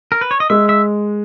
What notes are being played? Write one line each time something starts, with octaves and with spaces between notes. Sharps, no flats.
A#4
B4
C#5
D#5
G#3 E5
E5